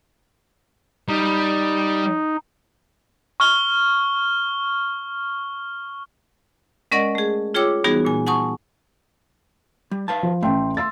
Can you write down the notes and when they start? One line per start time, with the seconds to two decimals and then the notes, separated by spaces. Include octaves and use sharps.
1.09 G3 D#4
3.40 C#6 F6 G7
6.92 G#3 C#4 A#4 D5 D#5 F#5
7.15 A3 G#4
7.54 F4 G#4 C#5 G5 D6 E6
7.84 E3 G3 B3 D#4 F#4 G#4
8.05 A#2 G#5
8.27 F#5 G#5 A5 C#6 D#6
9.91 G3
10.08 B4 F5 A5
10.23 F3
10.43 A1 A3 G5 C6
10.77 C6 E6 A6